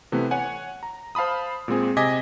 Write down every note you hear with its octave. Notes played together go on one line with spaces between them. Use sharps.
C3 E3 A3 B3
C#5 F#5 G#5
A#5
C5 F5 A5 B5 D#6
A#2 G#3 C4 G#4
C3 D#5 G#5 D6 G#6 B6